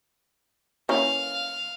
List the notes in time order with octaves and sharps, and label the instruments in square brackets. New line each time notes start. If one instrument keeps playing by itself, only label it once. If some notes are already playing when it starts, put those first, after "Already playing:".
[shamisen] E3 A#3 C#4 [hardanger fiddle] F5